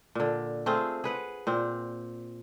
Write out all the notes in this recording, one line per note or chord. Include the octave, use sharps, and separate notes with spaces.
A#2 D3
A3 C4 F4 G#4
G#4 B4 F#5
A#2 C4